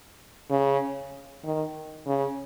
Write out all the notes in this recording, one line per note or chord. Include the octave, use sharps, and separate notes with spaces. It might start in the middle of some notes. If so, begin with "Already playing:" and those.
C#3
D#3
C#3